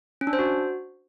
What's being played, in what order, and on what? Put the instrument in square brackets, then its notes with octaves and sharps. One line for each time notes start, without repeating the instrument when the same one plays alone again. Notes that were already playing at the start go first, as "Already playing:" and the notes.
[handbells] C#4
D4
C5
F#4